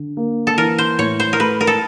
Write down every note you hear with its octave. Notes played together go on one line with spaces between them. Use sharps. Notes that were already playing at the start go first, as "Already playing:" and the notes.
Already playing: D3
A#3
A4
E3 A#4
C5
A2 C#5
C5
A#4
A3 B4
A#4
A4